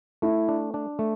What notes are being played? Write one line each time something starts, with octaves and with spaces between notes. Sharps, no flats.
A3 E4
D4
D4
A3